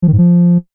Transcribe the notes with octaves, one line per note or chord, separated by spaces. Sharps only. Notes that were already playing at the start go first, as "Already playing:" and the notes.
F3
D#3
G#2
F3